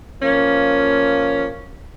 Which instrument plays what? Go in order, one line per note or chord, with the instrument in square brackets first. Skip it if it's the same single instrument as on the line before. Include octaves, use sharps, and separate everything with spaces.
[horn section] F3 A#3 C#4